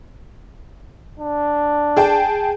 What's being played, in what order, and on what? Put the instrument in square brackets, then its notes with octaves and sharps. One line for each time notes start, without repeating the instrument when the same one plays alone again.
[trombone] D4
[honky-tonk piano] G#4 G5 A5